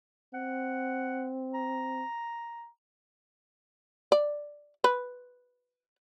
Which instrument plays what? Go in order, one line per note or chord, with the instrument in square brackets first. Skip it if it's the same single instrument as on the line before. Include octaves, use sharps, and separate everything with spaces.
[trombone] C4 [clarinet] F#5
[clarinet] A#5
[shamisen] D5
B4